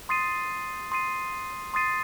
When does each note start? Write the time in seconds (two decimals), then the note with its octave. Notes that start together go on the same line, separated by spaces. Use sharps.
0.09 C6 D#6 A6 C7 D#7
0.92 C6 D#6 A6 C7 D#7
1.74 C6 D#6 A6 C7 D#7